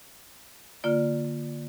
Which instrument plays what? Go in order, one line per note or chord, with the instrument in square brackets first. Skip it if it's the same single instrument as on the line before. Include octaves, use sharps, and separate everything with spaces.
[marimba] D3 A#3 F4 D5